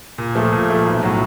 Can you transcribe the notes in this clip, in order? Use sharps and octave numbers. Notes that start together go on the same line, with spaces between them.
A#2
F3 A3
A#2
F3 A3
B1
A2 F#3